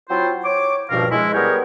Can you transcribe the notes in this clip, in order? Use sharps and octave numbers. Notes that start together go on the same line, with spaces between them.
F#3 C4 E4 F4 C5
C#5 D6
C#2 G2 B2 F3 A#4 F5
G#3 E4
G3 B3 G#4 A#4 C#5 G5